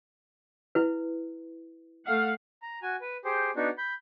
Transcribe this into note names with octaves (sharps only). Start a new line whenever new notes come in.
E4 B4
A3 F5 F#5
A#5
F#4 G#5
B4
G4 G#4 C5
B3 D4 D#4 F#4
B5 G6